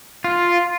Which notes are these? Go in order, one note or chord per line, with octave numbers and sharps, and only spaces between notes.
F4